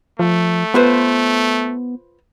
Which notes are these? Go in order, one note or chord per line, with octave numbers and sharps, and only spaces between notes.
F3 A3
B3 F4 B4 C5